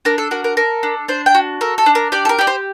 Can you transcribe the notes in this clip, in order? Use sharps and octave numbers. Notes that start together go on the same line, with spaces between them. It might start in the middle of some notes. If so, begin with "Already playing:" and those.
D4 A#4
A4
F#4 A#4
A#4
A4 A#4
D4
D4 C5
G5
F#4
A4 A#4
A4
D4
A#4
G4 D5
A4
A#4
G4 D5
C5